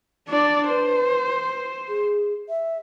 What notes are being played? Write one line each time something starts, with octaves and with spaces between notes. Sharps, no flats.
D4 D5
B4 C5
G#4
E5